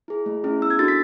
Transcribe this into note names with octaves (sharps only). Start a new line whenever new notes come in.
E4 G#4
A3
C#4 E4 G#4
B3 E6
G#6
D4 F#4 A4 A6
B6